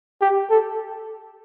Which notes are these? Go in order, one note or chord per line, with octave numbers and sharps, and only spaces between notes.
G4
A4